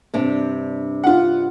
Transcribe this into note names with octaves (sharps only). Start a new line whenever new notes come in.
G2 C3 D4
F4 F#5